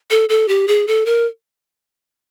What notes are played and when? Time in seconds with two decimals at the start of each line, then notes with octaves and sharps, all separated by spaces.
0.11 A4
0.29 A4
0.48 G4
0.68 G#4
0.87 A4
1.06 A#4